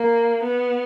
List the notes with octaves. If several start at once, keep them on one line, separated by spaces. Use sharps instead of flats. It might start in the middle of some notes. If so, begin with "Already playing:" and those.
Already playing: A#3
B3